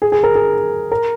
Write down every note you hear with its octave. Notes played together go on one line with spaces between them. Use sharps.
G#4
G#4
A#4
G#4
A#4